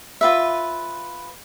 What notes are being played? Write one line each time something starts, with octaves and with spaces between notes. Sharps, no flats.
F4 B4 E5